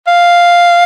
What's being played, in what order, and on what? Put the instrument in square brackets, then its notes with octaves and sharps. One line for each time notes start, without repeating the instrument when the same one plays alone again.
[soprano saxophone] F5